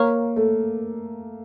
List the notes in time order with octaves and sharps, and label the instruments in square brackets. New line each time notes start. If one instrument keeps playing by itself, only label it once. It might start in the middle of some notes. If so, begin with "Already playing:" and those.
Already playing: [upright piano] A#3 [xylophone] C#5 F5 A#5 C#6 F6
[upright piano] A3